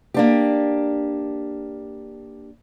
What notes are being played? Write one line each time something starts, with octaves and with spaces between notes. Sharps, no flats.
A#3 D4 G4